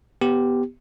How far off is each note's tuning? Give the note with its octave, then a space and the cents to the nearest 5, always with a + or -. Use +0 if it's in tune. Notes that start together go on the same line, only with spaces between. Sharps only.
B3 +0 G4 +0